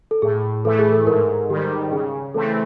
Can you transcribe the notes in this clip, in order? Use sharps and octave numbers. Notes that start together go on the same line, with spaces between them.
A4
A2 G#4
E3 A3 A4
G#4
A4
G#2 A#4
D#3 G3 G4
C#3 G#4
E3 A3 C4 A4